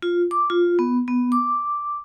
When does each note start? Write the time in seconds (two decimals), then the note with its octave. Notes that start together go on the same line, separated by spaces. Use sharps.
0.03 F4
0.31 D6
0.50 F4
0.79 B3
1.08 B3
1.32 D6